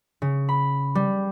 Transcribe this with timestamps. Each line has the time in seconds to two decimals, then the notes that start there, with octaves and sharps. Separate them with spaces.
0.22 C#3
0.49 B5
0.95 G3